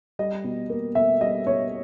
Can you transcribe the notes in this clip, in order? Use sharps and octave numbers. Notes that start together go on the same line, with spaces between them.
G3 D#5
B2
A#3
B2 E5
G3 D#5
B2 C#5